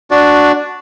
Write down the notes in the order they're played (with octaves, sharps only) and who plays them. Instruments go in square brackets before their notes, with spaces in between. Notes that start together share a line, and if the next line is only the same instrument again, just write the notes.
[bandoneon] D4 F#4 D5